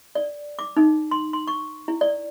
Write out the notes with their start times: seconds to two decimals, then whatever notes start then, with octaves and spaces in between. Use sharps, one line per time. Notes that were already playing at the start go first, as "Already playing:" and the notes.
0.15 D5
0.59 D6
0.77 D#4
1.11 C6
1.33 C6
1.47 C#6
1.88 E4
2.01 D5